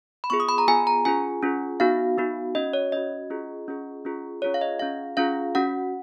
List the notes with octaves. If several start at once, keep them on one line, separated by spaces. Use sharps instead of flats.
B5
B3 F4 G#4 C#6
D#6
B5
A#5
B3 F4 G#4 G#5
A#5
C#4 F4 G#4 G#5
C#4 F4 G#4
B3 D#4 F#4 F5
B3 D#4 F#4
C#4 F#4 D#5
C#5
C#4 F#4 D#5
C#4 F4 G#4
C#4 F4 G#4
C#4 F4 G#4
C#4 F4 G#4 C#5
F5
D#5
C#4 F4 G#4 F5
C#4 F4 G#4 F5
C#4 F#4 F#5